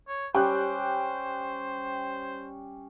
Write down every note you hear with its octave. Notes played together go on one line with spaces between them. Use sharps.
C#5
G3 C#4 G4 C5 G5 F#6